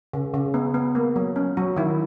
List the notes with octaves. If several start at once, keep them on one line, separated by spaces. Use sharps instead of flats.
C#3
C#3
B3
B3
A#3
F#3
C#4
F#3 F#4
D#3 E4